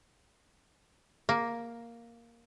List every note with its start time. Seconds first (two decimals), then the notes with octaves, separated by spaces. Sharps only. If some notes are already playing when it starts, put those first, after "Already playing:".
1.29 A#3